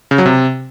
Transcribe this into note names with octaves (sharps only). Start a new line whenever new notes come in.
C#3
F#3
C3